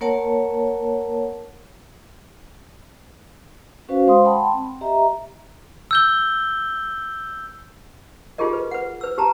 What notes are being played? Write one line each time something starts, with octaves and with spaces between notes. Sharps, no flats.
A#3 A#4 C#5 F#5 A5
C#4 F#4 B4 C5 F5
G#3 C5 F5 C6 D#6
F#5 G5 A5 B5 C6
C4
G4 D#5 E5 A#5
E6 G6 G7
D#4 F4 G4 G#4 A#4 D#5
B4
B4 F#5
B4 E6
G4 B4 A5 A#5